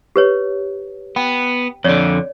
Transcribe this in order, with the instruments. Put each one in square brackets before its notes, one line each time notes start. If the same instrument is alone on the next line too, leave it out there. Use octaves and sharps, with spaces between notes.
[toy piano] G4 B4 C#5
[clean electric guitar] B3 [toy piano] G5
[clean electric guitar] F2 D3 [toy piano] C#5 D5